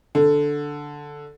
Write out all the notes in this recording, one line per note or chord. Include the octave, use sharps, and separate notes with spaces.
D3